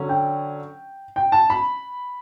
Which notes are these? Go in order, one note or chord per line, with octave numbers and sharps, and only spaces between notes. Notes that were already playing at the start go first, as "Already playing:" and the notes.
Already playing: D3 F#3 C#4
G5
G5
A5
B5